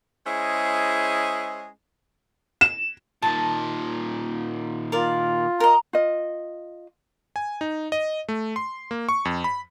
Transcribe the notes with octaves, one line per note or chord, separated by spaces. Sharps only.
G#3 C#4 E4 G#4 C5 D#5
E7
A#2 D#3 A5
F4 A#4 D5
A#4 D#5 A#5
F4 D#5
G#5
D#4
D#5
A3
C6
A#3
C#6
F2
B5